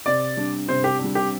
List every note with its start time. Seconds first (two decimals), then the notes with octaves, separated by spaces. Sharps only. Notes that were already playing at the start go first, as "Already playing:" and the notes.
0.06 C3 D5
0.37 G3 D4
0.68 C3 C5
0.84 G4
0.99 D4
1.04 G3
1.15 G4